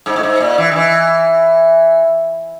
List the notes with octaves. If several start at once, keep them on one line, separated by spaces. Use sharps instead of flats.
G#2
A2
G#2
A#2
E3
D#3
E3